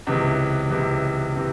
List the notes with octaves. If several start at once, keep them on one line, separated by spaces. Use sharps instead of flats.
C#2 C3 E3
C#2 C3 E3
C3 E3